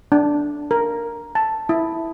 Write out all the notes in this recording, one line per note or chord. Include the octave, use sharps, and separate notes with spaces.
D4
A#4
A5
E4